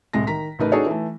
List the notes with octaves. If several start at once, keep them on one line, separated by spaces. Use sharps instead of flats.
C2 A2 G#3 A#6
D#3 A#5 B6
A1 C#3 A3 D#4 A#4 B4
D4 D#4 F#4 G#4 A4 C#5
E3 A3